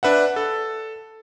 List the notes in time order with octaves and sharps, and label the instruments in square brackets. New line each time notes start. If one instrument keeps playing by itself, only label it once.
[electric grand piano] D4 B4 E5 F#5
A4